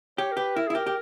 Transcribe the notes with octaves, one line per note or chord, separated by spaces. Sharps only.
G4 C#5
A#4
G4 B4
E4 A#4
E4 G#4
G4 A#4
G4